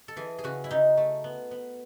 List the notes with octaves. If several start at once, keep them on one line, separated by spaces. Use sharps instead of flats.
A4
E3 G#4
G#4
C#3 F#4
E4
C#3 D#4
A3
B3
B3